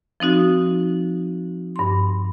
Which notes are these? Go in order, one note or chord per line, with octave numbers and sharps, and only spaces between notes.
F3 C4 D#4 F#4
G2 C6